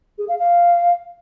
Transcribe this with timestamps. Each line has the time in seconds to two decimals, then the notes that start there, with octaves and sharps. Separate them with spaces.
0.18 G#4
0.28 F5
0.39 F5